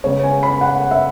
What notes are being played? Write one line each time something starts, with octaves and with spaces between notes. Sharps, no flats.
C#3 G#3 B3 C#5
G#5
B5
F#5
E5